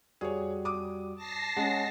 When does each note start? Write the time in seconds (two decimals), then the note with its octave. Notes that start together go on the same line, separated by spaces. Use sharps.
0.21 F2 G3 F#4 G#4 C#5
0.65 D6 D#6
1.16 A5 A#6 C7
1.57 G#3 C#4 D#5 F#5